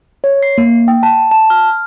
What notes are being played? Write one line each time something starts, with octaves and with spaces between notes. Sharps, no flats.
C#5
C7
A#3
G5
A5
A5
F6